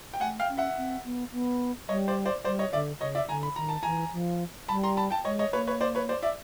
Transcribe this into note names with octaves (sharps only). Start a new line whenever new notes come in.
G5
A3 F#5 G#5
F5 G5
C#4
E5 F#5
C4
B3
B3
G3 C#5 D#5
C5 D5
C5 D5
G3 C5 D5
C#5 D#5
D3 D5 E5
C#3 C#5 D#5
D5 E5
D3 G#5 A#5
B5
D#3 A#5
A5
E3 G#5 A#5
F3
G3 A5 B5
A#5 C6
A5 B5
G5 A5
G#3 C#5 D#5
C#5 D#5
A#3 B4 C#5
B4 C#5
C5 D5
B4 C#5
C5 D5
D5 E5